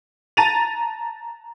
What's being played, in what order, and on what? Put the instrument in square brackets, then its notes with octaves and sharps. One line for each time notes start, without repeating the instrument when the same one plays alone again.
[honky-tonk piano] A5 A#5 A6 D#7 F7